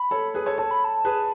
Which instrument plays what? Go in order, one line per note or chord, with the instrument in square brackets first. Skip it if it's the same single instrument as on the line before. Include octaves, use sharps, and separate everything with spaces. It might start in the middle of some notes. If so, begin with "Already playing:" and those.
Already playing: [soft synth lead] B5
[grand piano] A4 C#5
G#4 B4
A4 C#5
[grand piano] A4 C#5 [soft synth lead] A5
[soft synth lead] B5
A5
[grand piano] G#4 B4